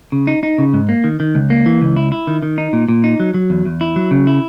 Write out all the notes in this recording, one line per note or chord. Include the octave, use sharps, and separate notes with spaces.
C#3
D#4
D#4
C#3
G#2
A#3
D#3
D#3
C#2
A#3
E3
C#2
E4
E4
D#3
D#3
D#4
A#2
A#2
D#4
F#3
F#3
E2
E2
E4
F#3
C#3
E4